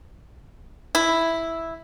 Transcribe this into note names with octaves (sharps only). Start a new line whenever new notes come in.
E4